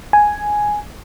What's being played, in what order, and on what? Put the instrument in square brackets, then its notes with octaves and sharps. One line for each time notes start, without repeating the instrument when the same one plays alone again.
[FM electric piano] G#5